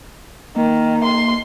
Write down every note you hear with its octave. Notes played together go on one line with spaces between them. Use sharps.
D#3 A#3
C6